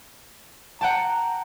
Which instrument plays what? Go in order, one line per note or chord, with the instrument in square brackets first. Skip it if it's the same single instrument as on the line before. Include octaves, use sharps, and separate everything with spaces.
[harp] F#5 G5 A5 [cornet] A#5